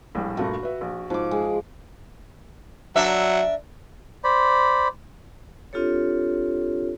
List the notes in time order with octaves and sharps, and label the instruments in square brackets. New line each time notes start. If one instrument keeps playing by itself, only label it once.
[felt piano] A#1 A2 G3
[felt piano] G2 A#2 A3 [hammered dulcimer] F#4
[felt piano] B4 E5
A#1
[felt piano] G#2 [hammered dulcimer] F3 D6
[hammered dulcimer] G#3
[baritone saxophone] F#3 [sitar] D4 A#4 E5
[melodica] C5 D5 B5
[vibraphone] C4 D4 F4 G4 A4 C#5